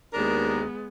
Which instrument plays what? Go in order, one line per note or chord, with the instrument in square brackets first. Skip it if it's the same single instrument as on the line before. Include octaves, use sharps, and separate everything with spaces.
[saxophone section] D#2 D4 A#4 [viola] G#3 B3